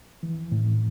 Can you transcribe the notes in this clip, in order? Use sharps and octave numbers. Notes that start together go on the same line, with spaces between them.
E3
A2